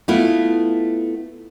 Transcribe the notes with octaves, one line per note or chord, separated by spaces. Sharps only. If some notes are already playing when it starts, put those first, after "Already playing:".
A3 B3 E4 F4